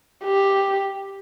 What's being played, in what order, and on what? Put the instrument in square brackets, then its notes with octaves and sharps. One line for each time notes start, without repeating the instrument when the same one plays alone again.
[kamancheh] G4